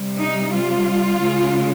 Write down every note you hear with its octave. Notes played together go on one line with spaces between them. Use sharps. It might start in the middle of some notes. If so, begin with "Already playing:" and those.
Already playing: C3 G3
D#4
F4
C#3 G#3